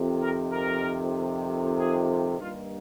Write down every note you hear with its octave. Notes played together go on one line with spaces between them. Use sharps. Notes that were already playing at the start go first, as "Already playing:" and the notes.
Already playing: F2 C3 D#3
A#4
A#4
G#4
G2 D#3 A#3 F4